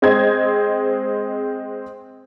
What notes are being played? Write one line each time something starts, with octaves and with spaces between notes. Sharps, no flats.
G#3 C4 C5 D#5 G#6